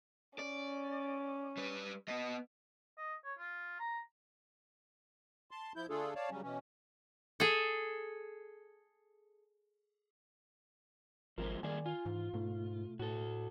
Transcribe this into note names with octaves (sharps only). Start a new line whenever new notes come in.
C#4 D5
G3 B4
B3 D#5
D#5
C#5
F4
A#5
A5 C6
F3 E4 G6
D3 A3 D4 F4 G#4 A4
C#5 D5 F5 A5
C#3 F#3 G3 C#4
B2 E3 C#4
G#4 A4
G#1 F3 G#3 C4 A#4
D#3 G3 A#3 G#4 D5 G#5
F4 G#5
G#2 E3
G#2 B2 A3
A2 F#4 A4